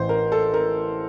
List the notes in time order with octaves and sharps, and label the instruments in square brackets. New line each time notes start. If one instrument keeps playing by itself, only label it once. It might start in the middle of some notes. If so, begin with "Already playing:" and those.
Already playing: [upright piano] A1 E3 [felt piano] C5
[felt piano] A#4
A4
A#4